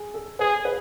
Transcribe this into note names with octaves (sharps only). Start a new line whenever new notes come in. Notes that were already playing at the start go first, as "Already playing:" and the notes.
Already playing: G#4
A4
G#4 B4
B4